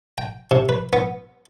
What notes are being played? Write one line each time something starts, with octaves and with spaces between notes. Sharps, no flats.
G5
C3
B4
B3